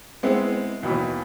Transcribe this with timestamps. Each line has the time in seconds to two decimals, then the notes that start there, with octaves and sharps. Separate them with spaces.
0.23 G#3 B3 C4 E4
0.83 D#2 B2 E3 F#3